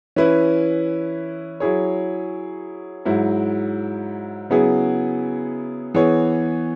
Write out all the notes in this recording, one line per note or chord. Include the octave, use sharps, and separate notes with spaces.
E3 C#4 E4 B4
F#3 E4 G#4 C#5
G#2 F#3 E4
C#3 F#3 B3 E4 G#4
E3 B3 G#4 C#5